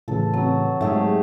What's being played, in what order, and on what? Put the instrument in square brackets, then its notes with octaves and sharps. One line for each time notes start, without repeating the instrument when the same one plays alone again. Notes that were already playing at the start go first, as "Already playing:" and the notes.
[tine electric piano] A2 C#3 E3 [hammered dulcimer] A4
[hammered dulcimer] F#3 [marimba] C4
[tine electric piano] G#2 [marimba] F#3 [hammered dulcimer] A3 G4 G#4